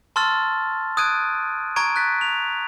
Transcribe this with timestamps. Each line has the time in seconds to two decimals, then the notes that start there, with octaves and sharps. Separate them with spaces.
0.16 A5 C6 C#6 E6 F6 A6
0.97 D#6 F#6 G#6 D7 D#7
1.76 A#5 C#6 G#6 D7 D#7
1.96 F#6 A6 B6
2.21 F7